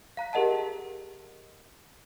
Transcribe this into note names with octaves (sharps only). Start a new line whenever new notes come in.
F5 A#5 F#6 B6
G4 G#4 A#4 D#5 F#5 A5